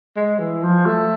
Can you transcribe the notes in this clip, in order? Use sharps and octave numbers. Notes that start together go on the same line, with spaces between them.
G#3
E3
F3
A3